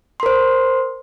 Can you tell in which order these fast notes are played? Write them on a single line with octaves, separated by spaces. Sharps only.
C6 A#4 C5